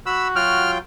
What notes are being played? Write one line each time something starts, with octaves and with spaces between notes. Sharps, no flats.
F#4 B5 E6
F#3 F4 G5 F6